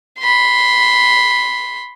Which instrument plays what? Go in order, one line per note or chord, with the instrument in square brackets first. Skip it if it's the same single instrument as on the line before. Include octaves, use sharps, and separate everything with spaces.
[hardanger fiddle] B5 C6